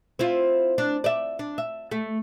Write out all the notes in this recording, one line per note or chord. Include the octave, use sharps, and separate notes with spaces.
C4 E4 F4
D4
D5 E5
D4
E5
A3